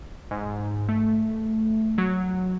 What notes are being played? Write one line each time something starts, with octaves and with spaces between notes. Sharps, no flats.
G#2
A3
F#3